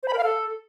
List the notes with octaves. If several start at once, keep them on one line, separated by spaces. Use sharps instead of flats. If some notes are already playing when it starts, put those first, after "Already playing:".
C5
B5
A#4
F5
A4